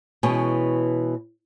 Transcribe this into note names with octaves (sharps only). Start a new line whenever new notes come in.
B2 E3 G#3 C#4